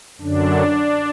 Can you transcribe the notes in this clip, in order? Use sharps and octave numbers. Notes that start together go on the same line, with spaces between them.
F#2 D3 F#3 D4